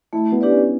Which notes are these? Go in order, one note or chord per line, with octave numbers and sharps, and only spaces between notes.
A3 E4
B3
D4 G4 B4 D5
C#4